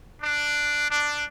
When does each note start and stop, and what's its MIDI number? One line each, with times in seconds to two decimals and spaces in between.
0.22 0.89 62
0.91 1.26 62